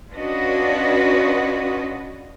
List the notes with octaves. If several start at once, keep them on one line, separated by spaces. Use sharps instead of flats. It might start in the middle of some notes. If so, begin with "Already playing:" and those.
C#4 D4 F4 F#4 B4 D#5